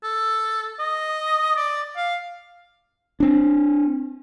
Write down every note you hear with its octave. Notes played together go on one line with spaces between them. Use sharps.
A4
D#5
D5
F5
C4 D4